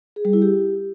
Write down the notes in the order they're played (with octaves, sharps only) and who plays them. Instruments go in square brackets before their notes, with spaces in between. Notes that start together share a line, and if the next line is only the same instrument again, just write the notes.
[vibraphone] G#4
G3
E4
G4